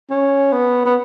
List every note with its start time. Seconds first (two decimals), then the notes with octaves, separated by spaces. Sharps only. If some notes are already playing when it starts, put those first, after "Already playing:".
0.10 C#4
0.53 B3
0.86 B3